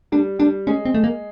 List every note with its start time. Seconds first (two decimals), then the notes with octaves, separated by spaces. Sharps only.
0.12 G3 D4
0.39 G3 D4
0.67 G#3 C#4
0.85 C4
0.94 A3
1.04 A#3